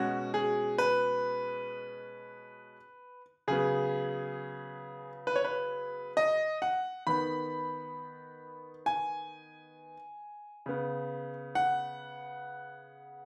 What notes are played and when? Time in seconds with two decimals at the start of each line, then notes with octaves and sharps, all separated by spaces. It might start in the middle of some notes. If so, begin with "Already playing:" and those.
Already playing: B2 G#3 C#4 F#4
0.34 G#4
0.78 B4
3.48 C#3 F#3 B3 G#4
5.27 B4
5.36 C#5
5.44 B4
6.17 D#5
6.62 F#5
7.07 D#3 B3 B5
8.86 G#5
10.66 C#3 B3
11.55 F#5